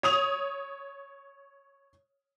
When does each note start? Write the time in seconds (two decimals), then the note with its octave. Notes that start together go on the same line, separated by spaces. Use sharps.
0.03 C#5 D#6 F7